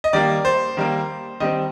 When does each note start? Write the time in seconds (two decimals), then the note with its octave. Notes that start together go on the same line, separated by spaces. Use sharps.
0.04 D#5
0.13 D#3 G3 A#3 D5
0.45 C5
0.77 D#3 G3 A#3
1.40 D#3 G3 C4 D#5